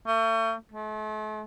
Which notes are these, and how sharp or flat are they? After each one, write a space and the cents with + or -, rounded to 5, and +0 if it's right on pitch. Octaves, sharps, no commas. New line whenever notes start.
A3 +40
A3 -40